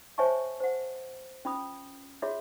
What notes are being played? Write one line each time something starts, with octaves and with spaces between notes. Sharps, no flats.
C5 C#5 E5 G#5 A5 C#6
C5 F#5
C#4 F4 B5 D#6
F4 F#4 G#4 C#5 E5